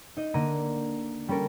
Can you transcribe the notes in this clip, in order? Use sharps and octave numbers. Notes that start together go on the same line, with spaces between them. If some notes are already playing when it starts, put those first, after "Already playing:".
D#4 D#5
D3 A#3 A#5 D#7
G3 C#4 A4 A#4